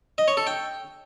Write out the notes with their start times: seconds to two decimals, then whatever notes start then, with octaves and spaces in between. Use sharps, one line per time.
0.18 D#5
0.28 C#5
0.37 A4
0.47 G5